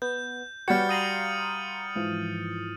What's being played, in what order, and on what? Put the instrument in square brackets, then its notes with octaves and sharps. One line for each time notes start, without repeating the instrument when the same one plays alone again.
[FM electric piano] B3 [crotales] G6
[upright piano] G3 F#4 [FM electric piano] B4 C#5 [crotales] F6 A6 C#7
[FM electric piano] F5 A#5 C6 [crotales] D#6 D#7 F#7
[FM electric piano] G#2 E3 F3